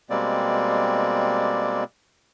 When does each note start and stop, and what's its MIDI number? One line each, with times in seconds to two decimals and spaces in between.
0.10 1.84 47
0.10 1.84 55
0.10 1.84 56
0.10 1.84 58
0.10 1.84 60
0.10 1.84 74